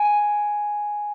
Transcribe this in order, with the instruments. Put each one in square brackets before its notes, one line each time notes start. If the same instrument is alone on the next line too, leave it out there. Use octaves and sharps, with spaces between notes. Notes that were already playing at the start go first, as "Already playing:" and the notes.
Already playing: [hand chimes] G#5